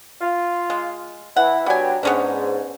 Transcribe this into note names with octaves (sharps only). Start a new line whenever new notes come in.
F4
G#3
E3 E4 F#5
F#3 B3 D4 G4 G#5
G#2 B3 C#4 D4